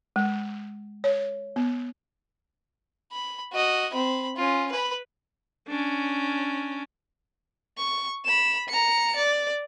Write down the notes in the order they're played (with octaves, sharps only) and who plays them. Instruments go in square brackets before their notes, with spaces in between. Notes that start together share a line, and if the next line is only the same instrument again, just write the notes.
[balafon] G#3
C#5
B3
[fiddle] B5
F#4 D#5
C4 B5
C#4 F4
B4 B5
[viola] C#4 D4
[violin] C#6
B5 E7
A#5 C#7
D5